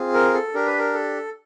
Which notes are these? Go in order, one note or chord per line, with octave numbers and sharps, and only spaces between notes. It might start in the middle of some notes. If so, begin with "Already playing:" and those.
Already playing: C4 F4 G#4
A#4
A4
D4 G4 A#4
B4
A#4
A4